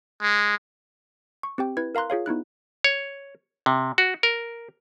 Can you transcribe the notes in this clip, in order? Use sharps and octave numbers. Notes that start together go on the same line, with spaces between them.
G#3
C#6
C4 G4 G5
E4 B4 G#6
A#4 F5 A#5 C6 F#6
F4 G#4 C#5 F5
B3 D#4 E4 F#6
C#5
C3
F#4
A#4